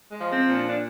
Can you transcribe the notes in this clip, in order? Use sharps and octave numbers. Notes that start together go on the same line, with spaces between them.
G#3
F3
C4
A#2
D4
D4